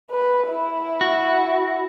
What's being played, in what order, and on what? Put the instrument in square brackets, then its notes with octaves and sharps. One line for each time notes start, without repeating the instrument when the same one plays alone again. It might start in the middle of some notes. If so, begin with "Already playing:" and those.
[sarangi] B4
E4
[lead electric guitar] F#4